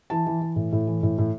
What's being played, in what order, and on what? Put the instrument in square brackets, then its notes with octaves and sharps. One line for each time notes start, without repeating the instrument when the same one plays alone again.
[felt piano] E3 A5
E3
E3
A2
A2
E3
A2
A2